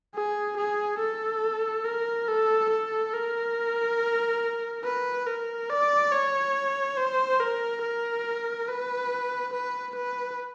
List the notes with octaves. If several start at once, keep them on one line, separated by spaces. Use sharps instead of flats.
G#4
G#4
A4
A#4
A4
A4
A#4
B4
A#4
D5
C#5
C5
A#4
A#4
B4
B4
B4